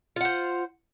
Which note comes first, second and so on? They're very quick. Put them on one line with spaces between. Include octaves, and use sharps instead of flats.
F4 F#5 C5